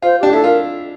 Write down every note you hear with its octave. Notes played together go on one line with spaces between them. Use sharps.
F4 C5
D4 G4
E4 A4
F4 A#4